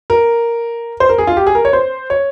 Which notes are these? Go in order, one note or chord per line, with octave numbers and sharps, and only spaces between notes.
A#4
C5
A#4
G#4
F4
G4
G#4
A#4
C#5
C5
C#5